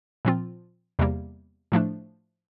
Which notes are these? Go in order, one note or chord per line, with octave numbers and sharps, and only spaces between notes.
A#2 F3 C4 F4
E2 C3 G3 A#3
A2 F3 A3 D4